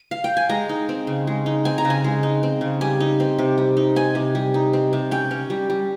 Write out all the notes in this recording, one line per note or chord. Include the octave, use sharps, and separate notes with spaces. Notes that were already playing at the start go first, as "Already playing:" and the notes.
Already playing: D#5
F5
G5
G#5
G#3 A#5
D#4
C4
C#3
G#3
D#4
C4 G#5
A#5
C#3
G#5
G#3
D#4
C4
C#3
G3 G#5
D#4
C4
C3
G3
D#4
C4 G#5
C3
G3
D#4
C4
C3
C#4 G5
C#4
G3
G3